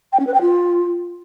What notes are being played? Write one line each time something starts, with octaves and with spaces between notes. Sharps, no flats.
G5
C#4
B4
G5
F4